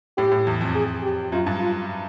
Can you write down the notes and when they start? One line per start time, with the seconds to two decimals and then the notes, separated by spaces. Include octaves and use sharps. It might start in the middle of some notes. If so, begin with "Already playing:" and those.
0.17 A2 G4
0.32 A2
0.47 E2
0.61 F2
0.75 G#4
1.02 G4
1.32 F#2 F4
1.46 G2
1.60 F4